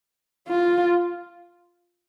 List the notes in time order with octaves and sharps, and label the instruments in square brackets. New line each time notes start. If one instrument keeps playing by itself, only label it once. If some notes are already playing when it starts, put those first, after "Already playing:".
[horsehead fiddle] F4